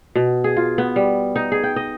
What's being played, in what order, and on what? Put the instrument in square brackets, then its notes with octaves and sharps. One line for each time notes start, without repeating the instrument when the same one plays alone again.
[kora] B2
G#4
F4
B3
G3
D#4
G#4
G5
D#5